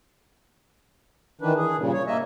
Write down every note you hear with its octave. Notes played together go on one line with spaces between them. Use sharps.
D#3 E3 D4 B4
G#4
G2 A#2 C#3
C#5
A#3 D#5 E5